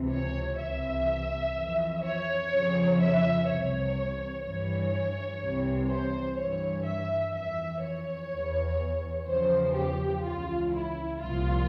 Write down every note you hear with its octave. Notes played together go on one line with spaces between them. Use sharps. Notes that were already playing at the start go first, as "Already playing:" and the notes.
Already playing: C#2 C3 E3
C#5
C2 C3 E3 E5
F2 E3
C#5
F2 C#3 F3
E5
C2 C3 E3 C#5
G2 E3 C#5
C2 C3 E3
C5
G2 E3 C#5
E5
F2 E3 E5
C#5
E2 E3
E2 C#3 F3 C5
G4
C#2 C#3 E3 F4
E4
C2 A#2 F3 F4